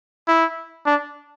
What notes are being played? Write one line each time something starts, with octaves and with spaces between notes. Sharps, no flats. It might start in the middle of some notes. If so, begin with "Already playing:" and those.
E4
D4